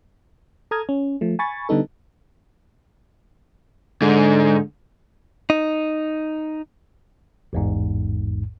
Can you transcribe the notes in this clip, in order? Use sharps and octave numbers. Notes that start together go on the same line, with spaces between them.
A4 A#5 D#6 F6 G#6
C#4
F3 A3
G#5 B5 C#6 A6
D3 G3 B3 D#4 A4
G#2 D3
D#4
A1 E2 G#2